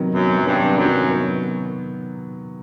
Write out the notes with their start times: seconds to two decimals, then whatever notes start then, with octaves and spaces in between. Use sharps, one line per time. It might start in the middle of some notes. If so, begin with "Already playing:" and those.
Already playing: C3 D#3 F#3 B3
0.14 F#2 B3
0.38 F#3
0.46 G2
0.62 C3
0.78 F#2
0.86 D#3
1.09 B3